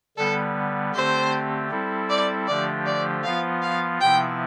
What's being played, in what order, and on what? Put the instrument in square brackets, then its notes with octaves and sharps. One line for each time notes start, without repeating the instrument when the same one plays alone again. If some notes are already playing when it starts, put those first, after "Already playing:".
[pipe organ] D3 G3 B3 [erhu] A4
[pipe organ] D3 A3 C4 G4 [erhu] C5
[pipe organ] G3 C4 E4 A4
[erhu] D5
[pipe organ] D3 F3 A3 D4 G4 [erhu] D5
[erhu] D5
[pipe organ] F3 B3 F4 [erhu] F5
[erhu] F5
[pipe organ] C3 F3 B3 E4 [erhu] G5